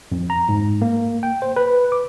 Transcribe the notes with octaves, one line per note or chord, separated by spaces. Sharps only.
F2
A#5
G#2
A#3
G5
C5
B4
D6